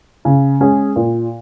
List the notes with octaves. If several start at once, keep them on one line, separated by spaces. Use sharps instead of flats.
C#3
G#3 C#4 G#4
A#2